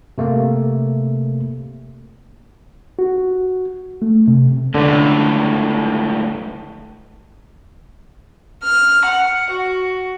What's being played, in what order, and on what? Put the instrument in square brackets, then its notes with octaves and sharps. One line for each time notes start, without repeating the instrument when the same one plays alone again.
[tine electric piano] C3 A3 A#3
[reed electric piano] F#4
A3
C3
[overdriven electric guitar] C#2 A2 [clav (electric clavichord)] D3
[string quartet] F6
F#5
F#4